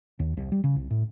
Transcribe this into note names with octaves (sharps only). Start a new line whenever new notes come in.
D#2
C2
G3
C#3
C2
A2